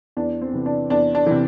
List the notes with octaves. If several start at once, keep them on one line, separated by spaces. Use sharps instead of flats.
E2 D4
C4
C3 E3
D4
E2 D4
D4
C3 E3